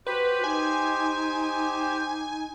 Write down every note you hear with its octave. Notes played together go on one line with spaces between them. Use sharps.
F#4 G4 B4 C5
D#4 G#5